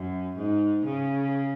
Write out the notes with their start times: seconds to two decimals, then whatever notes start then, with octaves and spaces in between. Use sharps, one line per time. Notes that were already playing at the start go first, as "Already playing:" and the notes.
Already playing: F#2
0.36 G#2
0.85 C#3